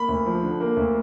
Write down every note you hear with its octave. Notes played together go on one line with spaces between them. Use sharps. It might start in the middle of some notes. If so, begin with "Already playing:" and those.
Already playing: A#3 B5
D2
F3
D3
A#3
D2